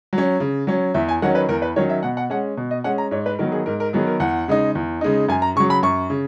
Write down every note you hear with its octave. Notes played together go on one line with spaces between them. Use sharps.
F#3
C#4
C#3
F#3 C#4
E2 E5
G#5
D#3 F#3 C#4 F#5
B4
E2 A#4
B4
D#3 F#3 C#4 C#5
E5
B2 F#5
F#5
G#3 C#4 F#5
B2
D#5
G#3 C#4 F#5
A#5
G#2 C#5
B4
D#3 F#3 B3 A#4
G#4
G#2 A#4
A#4
D#3 F#3 B3 G#4
A#4
E2 F#5
C#3 G#3 D#4
E2
C#3 G#3 D#4
F#2 G#5
A#5
C#3 F#3 C#6
B5
F#2 C#6
C#3